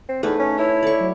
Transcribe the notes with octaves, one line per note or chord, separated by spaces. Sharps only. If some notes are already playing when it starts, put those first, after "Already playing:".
C4
E2 A3 D#4 B4
C#4
E4 C#5
A4 D5 C#6
F#3